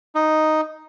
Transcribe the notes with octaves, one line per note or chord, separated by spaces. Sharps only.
D#4